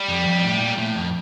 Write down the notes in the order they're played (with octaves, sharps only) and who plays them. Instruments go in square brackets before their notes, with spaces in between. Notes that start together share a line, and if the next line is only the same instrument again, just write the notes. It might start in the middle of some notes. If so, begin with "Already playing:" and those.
Already playing: [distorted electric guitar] G3
[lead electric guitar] F2
F2
A2
A#2
A2
F2